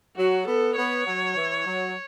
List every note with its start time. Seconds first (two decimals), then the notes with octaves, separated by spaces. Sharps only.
0.17 F#3 F#4
0.47 B3 A4
0.76 B3 C#5
1.06 F#3
1.36 E3
1.66 F#3